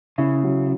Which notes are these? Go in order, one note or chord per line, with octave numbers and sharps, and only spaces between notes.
C#3 E4
F#3